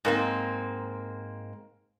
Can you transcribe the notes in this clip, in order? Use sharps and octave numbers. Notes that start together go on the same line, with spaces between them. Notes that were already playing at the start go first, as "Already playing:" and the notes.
G#2 A#3 C4